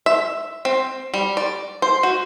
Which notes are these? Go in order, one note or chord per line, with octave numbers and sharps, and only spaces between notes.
E5
C4
G3
D5
C5
F#4